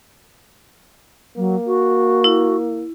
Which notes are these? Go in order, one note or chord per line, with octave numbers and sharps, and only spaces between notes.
F#3 A#3
F#4
E4